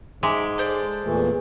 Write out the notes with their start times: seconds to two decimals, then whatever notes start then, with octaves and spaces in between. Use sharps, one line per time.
0.23 G#2 G#3 E5 A#5 D6
0.58 A4 C5 D5
1.05 E2 A#2 E3 A3